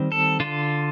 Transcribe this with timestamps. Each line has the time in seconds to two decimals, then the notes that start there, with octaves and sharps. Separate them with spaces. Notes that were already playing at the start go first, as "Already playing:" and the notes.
Already playing: D#3 G3 C4
0.12 A4
0.40 D3 F4